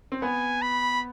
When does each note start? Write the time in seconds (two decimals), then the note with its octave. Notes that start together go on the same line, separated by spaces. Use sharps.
0.12 C4
0.22 B3 G#5
0.62 B5